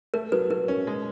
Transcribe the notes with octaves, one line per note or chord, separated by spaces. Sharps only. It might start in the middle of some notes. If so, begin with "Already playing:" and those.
A3 A#4
F#3 B4
F#3 A#4
C#4
G#3